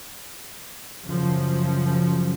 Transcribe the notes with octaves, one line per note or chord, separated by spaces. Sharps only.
F#2 C#3 F3 F#3